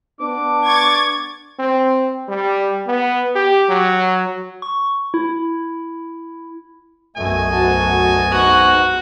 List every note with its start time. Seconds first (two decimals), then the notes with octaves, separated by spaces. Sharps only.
0.20 B3 D4 D6
0.64 C#6 G#6 A6
1.59 C4
2.28 G3
2.87 B3
3.35 G4
3.69 F#3
4.62 C#6
5.14 E4
7.16 B1 F#2 A3 D#5 G#5
7.52 D2 F#4 A5
8.31 G#2 B3 F#4 A#5